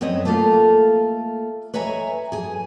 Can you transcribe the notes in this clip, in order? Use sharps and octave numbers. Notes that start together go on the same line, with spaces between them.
F#2 C4 B4 C#5 D#5
A3 A#3 F4 A4 F5
B4 C#5 D#5 E5 G#5 A#5
G#4 G#5